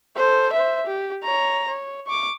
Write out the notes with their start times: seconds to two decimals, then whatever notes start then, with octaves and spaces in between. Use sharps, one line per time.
0.16 A4 C5
0.53 C5 E5
0.86 G4
1.24 C#5 A#5
1.68 C#5
2.07 C#6 D6